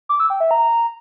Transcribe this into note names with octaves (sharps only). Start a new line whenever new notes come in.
D6
E6
G5
E5
A#5